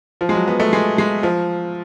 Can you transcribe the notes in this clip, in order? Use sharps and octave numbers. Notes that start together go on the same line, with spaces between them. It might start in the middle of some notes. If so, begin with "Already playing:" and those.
F3
G#3
F#3
B3
A3
G#3
G#3
F3